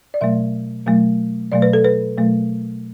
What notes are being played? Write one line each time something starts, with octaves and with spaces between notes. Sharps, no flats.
D5
B2 F#3 A3 E5
B2 F#3 A3
B2 F#3 A3 D5
B4
A4
B4
B2 F#3 A3